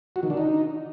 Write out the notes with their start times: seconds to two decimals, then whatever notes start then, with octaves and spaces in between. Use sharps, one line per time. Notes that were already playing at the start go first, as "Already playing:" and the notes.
0.16 F#4
0.23 D#3
0.30 D4
0.37 D#4